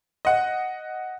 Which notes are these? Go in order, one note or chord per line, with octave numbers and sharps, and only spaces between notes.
D#5 F#5